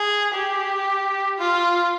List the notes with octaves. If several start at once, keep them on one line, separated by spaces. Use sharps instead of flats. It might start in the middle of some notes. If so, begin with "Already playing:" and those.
Already playing: G#4
G4
F4